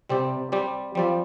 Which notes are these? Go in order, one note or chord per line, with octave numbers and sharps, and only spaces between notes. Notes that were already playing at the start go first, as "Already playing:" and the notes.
C3 G3 C4 G4 D5
G3 C4 G4 D5
F3 G3 C4 G4 D5